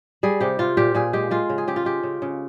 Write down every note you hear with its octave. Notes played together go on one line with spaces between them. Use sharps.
G3 G#4
C3 G4
C3 F4
A#2 G4
A#2 G#4
G#3 G4
G#3 F4
C#3
G#4
C#3 G4
F4
G#3 G4
C#3
C#3